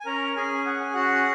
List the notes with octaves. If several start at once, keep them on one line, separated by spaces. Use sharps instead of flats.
G#5
C#4 A#4 A#5
C#4 G#4 G#5
G#4 F#5
G#5
C#4 F#4 F#5